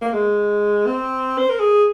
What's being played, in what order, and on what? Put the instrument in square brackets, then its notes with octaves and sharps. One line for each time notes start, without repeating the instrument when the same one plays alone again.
[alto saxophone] A#3
G#3
C4
C5
A#4
G#4